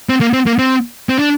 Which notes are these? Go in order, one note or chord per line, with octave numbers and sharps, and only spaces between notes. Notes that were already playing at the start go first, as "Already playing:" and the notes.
C4
A#3
C4
A#3
C4
C4
D4